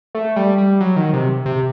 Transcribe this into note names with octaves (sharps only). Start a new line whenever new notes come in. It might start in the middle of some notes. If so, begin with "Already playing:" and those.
A3
G3
G3
F#3
D#3
C3
C3